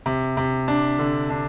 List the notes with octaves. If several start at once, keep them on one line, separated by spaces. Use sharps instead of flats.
C3
C3
D4
D3
D4